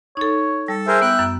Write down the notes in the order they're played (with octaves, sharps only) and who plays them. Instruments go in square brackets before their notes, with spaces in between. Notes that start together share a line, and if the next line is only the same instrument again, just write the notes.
[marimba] D#4 A4 [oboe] C#5
[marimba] G3 [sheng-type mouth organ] A4
[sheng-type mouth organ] G#4 A#4 C5 [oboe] E5
[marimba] B3 [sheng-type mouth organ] G5 F#6
[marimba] F#2